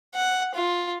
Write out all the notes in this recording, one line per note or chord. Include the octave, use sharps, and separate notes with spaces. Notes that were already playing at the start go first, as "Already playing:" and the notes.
F#5
F4